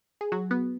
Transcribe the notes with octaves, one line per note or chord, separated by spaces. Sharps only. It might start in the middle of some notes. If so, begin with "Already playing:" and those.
G#4
F#3 F#4
B3